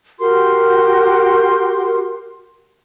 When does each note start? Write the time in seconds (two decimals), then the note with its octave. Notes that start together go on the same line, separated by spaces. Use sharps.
0.19 F#4 G4 A#4 C6